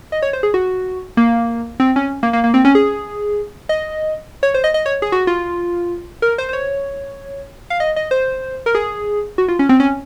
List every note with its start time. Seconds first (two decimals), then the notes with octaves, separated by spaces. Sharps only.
0.12 D#5
0.22 C#5
0.33 C5
0.43 G#4
0.54 F#4
1.17 A#3
1.80 C4
1.96 C#4
2.23 A#3
2.33 A#3
2.44 A#3
2.54 C4
2.65 C#4
2.75 G#4
3.69 D#5
4.43 C#5
4.54 C5
4.64 D#5
4.74 D#5
4.86 C#5
5.02 G#4
5.12 F#4
5.27 F4
6.22 A#4
6.38 C5
6.49 C5
6.53 C#5
7.70 F5
7.80 D#5
7.96 D#5
8.11 C5
8.66 A#4
8.75 G#4
9.38 F#4
9.48 F4
9.59 C#4
9.69 C4
9.80 C#4